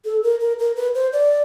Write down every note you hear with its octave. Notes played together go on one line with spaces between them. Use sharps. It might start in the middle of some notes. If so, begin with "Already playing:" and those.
A4
A#4
A#4
A#4
B4
C5
D5